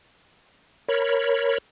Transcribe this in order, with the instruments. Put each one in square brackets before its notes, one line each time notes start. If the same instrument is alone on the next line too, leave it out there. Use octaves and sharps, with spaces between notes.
[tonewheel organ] A#4 C#5 B5